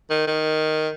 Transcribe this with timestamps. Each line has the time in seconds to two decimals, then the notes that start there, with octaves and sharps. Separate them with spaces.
0.10 D#3
0.27 D#3